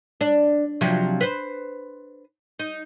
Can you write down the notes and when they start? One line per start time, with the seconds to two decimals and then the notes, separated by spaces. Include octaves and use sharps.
0.21 D4
0.81 C3 F3 F#3
1.21 B4 C5
2.59 D#4